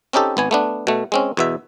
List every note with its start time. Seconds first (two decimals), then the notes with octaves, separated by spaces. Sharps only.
0.13 C4 C#4 D#4 G4 A4
0.37 G#1 B3 G#5
0.51 A3 B3 D4
0.87 B2 A3
1.12 G#3 C4 C#4
1.37 E2 B2 E5